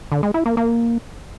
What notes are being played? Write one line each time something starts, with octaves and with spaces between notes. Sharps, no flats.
D3
G#3
E4
A#3
A#3